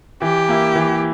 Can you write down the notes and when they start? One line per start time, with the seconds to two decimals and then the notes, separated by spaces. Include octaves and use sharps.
0.21 E3 G4
0.49 A#3 E4
0.76 E3